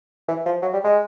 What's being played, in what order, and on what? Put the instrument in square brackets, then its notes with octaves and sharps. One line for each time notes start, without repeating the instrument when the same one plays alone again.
[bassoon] E3
F3
F#3
G3
G#3